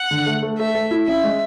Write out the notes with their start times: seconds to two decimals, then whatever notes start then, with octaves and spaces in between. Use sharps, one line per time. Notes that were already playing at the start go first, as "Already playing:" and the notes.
Already playing: F#5
0.11 D3
0.26 A3
0.43 A3
0.58 A3 E5
0.75 A3
0.91 E4
1.07 C#4 E5
1.24 G#3